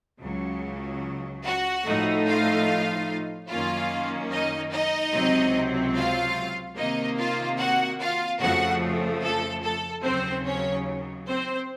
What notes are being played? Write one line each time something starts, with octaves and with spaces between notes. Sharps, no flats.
C#2 C#3 F#3
F#4 F#5
A2 F3 A3 D#4
F4 F5
F#2 D#3 A#3 C#4 F4 F5
D#4 D#5
D#4 D#5
C#2 C3 F#3 C4
F4 F5
C3 D#3 A#3 D#4 D#5
F4 F5
F#4 F#5
F4 F5
F2 C#3 F3 A3 F#4 F#5
A4
A4
D#2 C#3 F#3 C4 C5
C#4 C#5
C4 C5